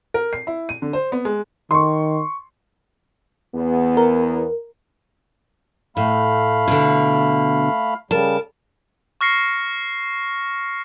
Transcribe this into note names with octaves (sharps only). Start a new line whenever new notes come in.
A#4
C7
E4
D#7
D3
C5
B3
G#3
D#3 C6 C#6
E2 B3
A#4
A2 A3 F5 B5
B2 D3
C#3 G3 A#4 A5
C#6 F6 A#6 C7 C#7